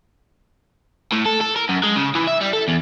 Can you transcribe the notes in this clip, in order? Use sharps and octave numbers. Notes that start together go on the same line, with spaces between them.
A2
A4
A4
A#4
F#2
G#3
C#3
E3
E5
G3
A4
E2